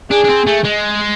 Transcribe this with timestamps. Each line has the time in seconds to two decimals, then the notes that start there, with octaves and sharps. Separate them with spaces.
0.10 D4 G#4
0.24 D4
0.29 C4
0.47 A3
0.64 G#3